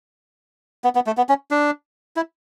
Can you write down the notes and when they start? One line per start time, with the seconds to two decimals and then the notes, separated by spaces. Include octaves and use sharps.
0.84 B3
0.95 B3
1.07 A3
1.17 B3
1.29 C#4
1.51 D4
2.16 E4